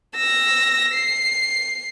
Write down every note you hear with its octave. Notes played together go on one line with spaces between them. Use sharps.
E6 A#6
C7